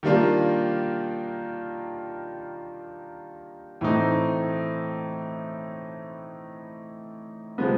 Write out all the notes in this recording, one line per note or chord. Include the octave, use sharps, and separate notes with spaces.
D#3 G3 A#3 D4 F4
A2 E3 A3 C4 D#4
C3 F3 G#3 B3